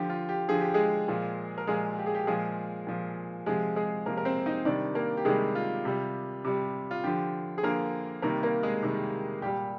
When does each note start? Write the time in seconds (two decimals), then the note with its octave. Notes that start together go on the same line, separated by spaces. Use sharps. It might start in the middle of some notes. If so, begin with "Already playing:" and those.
Already playing: D3 F3 G4
0.09 F4
0.29 G4
0.49 D3 F3 G#4
0.61 G4
0.74 G#3 G#4
1.08 A#2 F3
1.58 A#4
1.67 A#2 F3 G#3 G#4
1.98 G4
2.06 G#4
2.15 G4
2.27 A#2 F3 G#3 G#4
2.87 A#2 F3
3.46 C3 F3 G#3 G#4
3.76 G#3 G#4
4.06 C3 F3 A#3 A#4
4.17 A#4
4.25 C4 C5
4.46 D#4 D#5
4.65 C3 D#3 G3 D4 D5
4.95 A#3 A#4
5.17 G4
5.25 C3 D#3 G3 G#3 G#4
5.55 F4
5.85 C3 G3
6.44 C3 G3
6.91 F4
7.04 D3 F3 G4
7.58 G#4
7.63 D3 F3 A#3 A#4
8.22 C3 D#3 G3 A#3 A#4
8.43 A#3 A#4
8.63 G#3 G#4
8.83 C3 D#3 G3
9.42 A#2 G3 G4